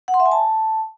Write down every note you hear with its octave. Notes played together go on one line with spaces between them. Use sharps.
F#5
C6
E5
G#5
A5